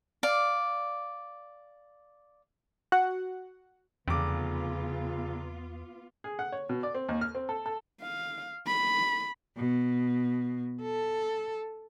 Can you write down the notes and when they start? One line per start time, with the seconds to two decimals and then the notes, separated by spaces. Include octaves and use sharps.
0.23 D5 F5
2.92 F#4 F#5
4.08 F1 E2 C#3 B3 F4 D6
6.24 G#4
6.39 F#5
6.52 C#5
6.69 B2
6.83 D5
6.94 C4
7.09 D#2
7.21 F6
7.35 C4
7.49 A4
7.66 A4
8.02 F5
8.67 B5
9.57 B2
10.82 A4